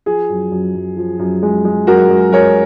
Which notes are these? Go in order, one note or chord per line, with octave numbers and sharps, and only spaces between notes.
F3 G#4
F#2
F#2
F#2
F3
F#2
G#3
G#3
F#2 F#4 A#4
G#3
G#3 A#4 C#5